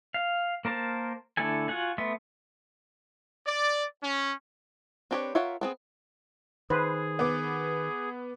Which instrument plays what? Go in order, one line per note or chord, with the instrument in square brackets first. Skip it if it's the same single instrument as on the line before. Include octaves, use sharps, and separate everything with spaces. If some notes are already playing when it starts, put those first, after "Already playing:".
[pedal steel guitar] F5
A#3 A#4 C5 A5
D3 A3 E4 A4 G#5
F4 F#4 F#5 G#5
A3 B3 E5 C6
[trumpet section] D5
C#4
[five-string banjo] C4 D4 G4 B4 C#5
F4 A#4 C#5 E5 F#5
B3 C4 G#4
[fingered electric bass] D#3 [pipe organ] G#4 [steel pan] B4 C5
[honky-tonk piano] B3 D6